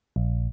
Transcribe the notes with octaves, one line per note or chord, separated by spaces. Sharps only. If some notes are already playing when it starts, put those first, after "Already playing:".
A#1